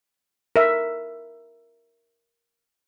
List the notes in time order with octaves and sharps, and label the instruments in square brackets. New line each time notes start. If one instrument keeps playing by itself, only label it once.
[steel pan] A#4 E5